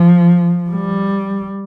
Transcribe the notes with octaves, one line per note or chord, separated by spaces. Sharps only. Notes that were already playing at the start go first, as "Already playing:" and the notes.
Already playing: F3
G3